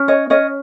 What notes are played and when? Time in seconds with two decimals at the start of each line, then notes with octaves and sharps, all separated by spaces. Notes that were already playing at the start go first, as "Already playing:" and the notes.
Already playing: C#4
0.08 C#5 D#5
0.30 C#4 C#5 D#5